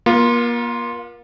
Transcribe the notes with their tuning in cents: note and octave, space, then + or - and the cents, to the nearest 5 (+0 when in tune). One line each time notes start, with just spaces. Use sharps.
A#3 +35 F4 +0